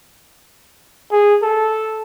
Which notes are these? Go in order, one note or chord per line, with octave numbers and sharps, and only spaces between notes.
G#4
A4